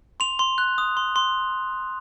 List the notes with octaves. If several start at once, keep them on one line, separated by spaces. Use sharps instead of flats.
C6 F7
C6
F#6
D#6
C6
C6